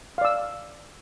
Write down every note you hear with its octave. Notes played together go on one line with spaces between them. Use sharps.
D5 F5 E6